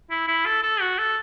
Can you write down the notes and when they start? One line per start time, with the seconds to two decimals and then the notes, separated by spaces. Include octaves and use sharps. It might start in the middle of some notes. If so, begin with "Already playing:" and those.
0.10 E4
0.28 E4
0.46 A4
0.63 A4
0.81 F#4
0.98 A4